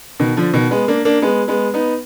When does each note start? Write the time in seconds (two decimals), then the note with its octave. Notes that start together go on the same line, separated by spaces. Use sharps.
0.19 B2 D#3
0.37 D3 F3
0.53 B2 D#3
0.71 G#3 B3
0.88 A#3 D4
1.05 A#3 D4
1.22 G#3 B3
1.48 G#3 B3
1.74 B3 D#4